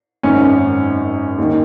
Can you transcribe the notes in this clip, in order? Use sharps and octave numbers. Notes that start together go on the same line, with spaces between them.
G#1 F#2 D#3 C#4
D#2 D#3